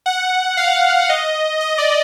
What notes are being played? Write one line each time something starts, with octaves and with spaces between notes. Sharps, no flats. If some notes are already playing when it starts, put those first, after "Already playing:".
F#5
F5
D#5
D#5
D5